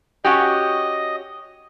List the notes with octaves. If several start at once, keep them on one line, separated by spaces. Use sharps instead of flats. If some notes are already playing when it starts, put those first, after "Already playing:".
C#4 F#4 G4 D#5